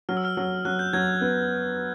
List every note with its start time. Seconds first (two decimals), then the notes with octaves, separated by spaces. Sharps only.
0.09 F#3 F6
0.17 E6
0.25 F6
0.37 F#3
0.65 F#3 F#6
0.79 G6
0.93 F#3 G#6
1.21 B3